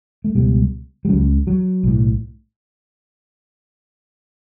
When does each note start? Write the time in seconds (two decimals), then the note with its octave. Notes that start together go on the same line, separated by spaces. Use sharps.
0.24 A3
0.35 C#2 B2 G3
1.05 G3
1.09 C#2 C#3 F#3
1.47 F#3
1.83 B1 A2